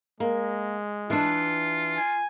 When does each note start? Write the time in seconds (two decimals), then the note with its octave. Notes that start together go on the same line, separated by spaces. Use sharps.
0.20 G#3 A#3
1.10 E3 D4 F4
1.97 G#5